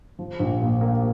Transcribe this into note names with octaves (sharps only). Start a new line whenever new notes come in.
F3
A#1
A#2
A#3